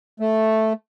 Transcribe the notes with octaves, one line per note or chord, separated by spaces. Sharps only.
A3